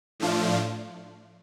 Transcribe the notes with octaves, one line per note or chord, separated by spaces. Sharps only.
A2 F3 A3 D4 F4